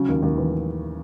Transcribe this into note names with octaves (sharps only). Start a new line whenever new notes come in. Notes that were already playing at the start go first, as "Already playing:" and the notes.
Already playing: C#3 F#3
D#2
D#2
E3